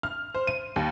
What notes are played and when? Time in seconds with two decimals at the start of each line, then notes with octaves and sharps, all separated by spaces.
0.03 F6
0.34 C5
0.47 D#7
0.76 D#2